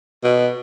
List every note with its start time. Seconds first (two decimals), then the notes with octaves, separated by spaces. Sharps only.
0.24 B2